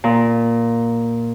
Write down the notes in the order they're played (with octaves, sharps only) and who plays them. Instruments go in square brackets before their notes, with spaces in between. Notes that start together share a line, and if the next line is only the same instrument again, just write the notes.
[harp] A#2